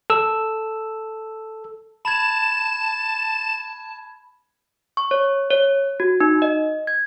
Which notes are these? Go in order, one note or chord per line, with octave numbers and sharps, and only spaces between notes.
A4 E6
A5 B5 G#6 E7
C#6
C#5
C#5
F#4
D#4
D#5
G#6